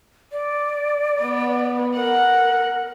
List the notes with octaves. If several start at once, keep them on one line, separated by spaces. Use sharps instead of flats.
D5
B3
A#4 F#5